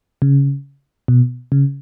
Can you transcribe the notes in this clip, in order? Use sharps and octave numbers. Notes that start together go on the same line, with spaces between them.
C#3
B2
C#3